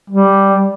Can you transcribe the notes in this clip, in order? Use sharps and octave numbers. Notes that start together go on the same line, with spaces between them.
G3